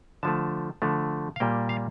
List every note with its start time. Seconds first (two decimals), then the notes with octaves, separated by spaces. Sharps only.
0.23 D3 F3 A3 A5
0.82 D3 F3 A3
1.36 F5
1.40 A#2 G3 A#3 G5
1.69 F5